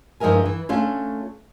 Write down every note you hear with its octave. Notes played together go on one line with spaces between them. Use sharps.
G2 F3 G#3 E4 A#4 G#5
E3
A3 C#4 D4 F4